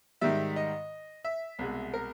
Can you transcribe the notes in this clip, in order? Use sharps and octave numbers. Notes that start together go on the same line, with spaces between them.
G#2 D#3 G3 E5
D#5
E5
C2 B2 G#3
A#4